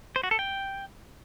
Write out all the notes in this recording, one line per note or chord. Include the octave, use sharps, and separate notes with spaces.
C5
F#4
A4
G5